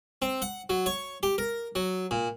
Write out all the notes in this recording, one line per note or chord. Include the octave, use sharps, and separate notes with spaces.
C4
F#5
F#3
C#5
G4
A#4
F#3
A#2